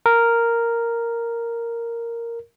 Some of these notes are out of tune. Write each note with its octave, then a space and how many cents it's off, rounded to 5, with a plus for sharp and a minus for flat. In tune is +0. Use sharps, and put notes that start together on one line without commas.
A#4 -5